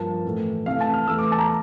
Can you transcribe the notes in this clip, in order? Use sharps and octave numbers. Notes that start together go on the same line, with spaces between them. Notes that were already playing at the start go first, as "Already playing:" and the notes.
Already playing: G2 F3 A#3 A5
A2 E3 A3
C3 E3 A3 F5
A5
F6
E2 E3 A3 E6
D6
A5
A#5